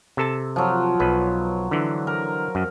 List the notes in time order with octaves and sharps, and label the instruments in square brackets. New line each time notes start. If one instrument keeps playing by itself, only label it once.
[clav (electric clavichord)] C3 A4 A5
[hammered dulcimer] F3 F#3
[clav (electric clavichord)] B1 B4
D3 E3
[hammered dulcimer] A#4
[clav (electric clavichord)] F#2